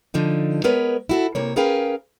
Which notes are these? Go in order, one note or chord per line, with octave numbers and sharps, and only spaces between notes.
D3 F3 D#4
G#3 B3 A#4 B4 C#5
E4 F#4 A4
C3 A#3 C#5
C#4 G#4 A#4 B4 F5 G5